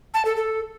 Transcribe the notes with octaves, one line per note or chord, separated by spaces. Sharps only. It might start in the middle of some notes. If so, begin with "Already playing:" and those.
A5
A4
A4